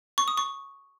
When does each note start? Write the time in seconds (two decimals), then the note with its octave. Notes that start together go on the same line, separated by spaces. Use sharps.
0.18 C#6
0.28 D#6
0.37 C#6